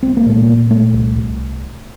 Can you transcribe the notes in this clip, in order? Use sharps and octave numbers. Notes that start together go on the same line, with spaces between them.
C2 C4
A#3
A#2 A3
A#3
A#2
A#2 A3
C2
C2